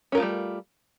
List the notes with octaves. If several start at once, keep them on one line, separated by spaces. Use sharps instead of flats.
G3 A3 C#4 F4 A#4